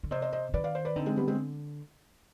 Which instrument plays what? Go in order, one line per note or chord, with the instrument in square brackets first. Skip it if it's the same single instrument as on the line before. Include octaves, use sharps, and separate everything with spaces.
[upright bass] D3
[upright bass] C3 [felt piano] C5 D#5
[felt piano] C5 D#5
C5 D#5
[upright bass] D#3 [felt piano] B4 D5
[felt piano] D5 F5
C5
B4 D5
[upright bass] D3 [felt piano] C4 D#4
[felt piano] G#3 C4
G3 B3
G#3 C4